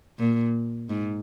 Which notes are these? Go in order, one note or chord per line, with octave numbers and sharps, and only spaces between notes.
A#2
G#2